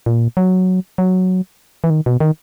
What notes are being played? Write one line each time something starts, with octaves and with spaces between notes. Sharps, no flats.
A#2
F#3
F#3
E3
D#3
B2
D#3